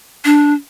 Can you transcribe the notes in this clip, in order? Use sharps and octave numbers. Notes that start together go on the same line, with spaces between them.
D4